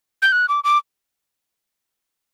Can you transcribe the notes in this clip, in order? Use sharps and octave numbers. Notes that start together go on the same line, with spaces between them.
G6
F#6
D6
D6